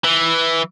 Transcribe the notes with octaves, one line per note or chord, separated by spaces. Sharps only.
E3